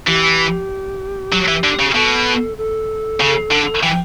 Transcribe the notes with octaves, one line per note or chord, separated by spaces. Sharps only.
E3 G4
F#3
E3
D3
C#3
B2 A4
A4
C#3
D3
E3 G5